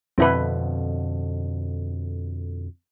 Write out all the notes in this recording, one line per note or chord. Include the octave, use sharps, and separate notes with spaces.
F2 B2 D3 C4 E4 B4